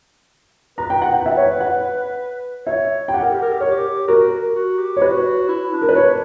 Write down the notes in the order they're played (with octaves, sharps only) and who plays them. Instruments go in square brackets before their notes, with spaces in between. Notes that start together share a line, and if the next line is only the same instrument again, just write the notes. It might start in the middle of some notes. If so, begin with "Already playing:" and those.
[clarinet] B4 [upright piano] A#5
[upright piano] G5
F#5
G5
E5
C#5
F#5
[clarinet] C#5 [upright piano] E5
[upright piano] G5
[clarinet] G4 [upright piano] F#5
[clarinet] A#4
G4
A#4
G4
[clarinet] A#4 [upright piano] C#5
[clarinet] G4
[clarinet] F#4 [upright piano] A#4
[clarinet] F#4
G4
[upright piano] C#5
[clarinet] F#4 [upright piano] B4
[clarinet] E4
D4
[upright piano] A#4
B4
C#5